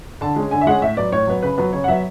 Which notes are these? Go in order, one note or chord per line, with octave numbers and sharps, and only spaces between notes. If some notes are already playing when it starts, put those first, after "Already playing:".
D3 A5
G#3 C#4
D3 G#5
E5
G#3 C#4 F#5
A2 E5
F#3 B3 D5
A2 C#5
F#3 B3
C#3 B4
F#3 B3
C#3 C#5
F#5
F#3 B3 E5